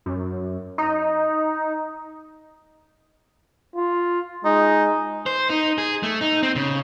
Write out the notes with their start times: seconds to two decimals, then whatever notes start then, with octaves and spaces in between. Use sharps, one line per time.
0.06 F#2
0.78 D#4
3.76 F4
4.45 G#3 D#4
5.26 C5
5.50 D#4
5.78 G#4
6.03 A3
6.21 D#4
6.43 C4
6.56 C#3